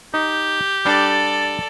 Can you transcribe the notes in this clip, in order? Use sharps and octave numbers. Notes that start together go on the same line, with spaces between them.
D#4 G4
G3 D4 A4 D5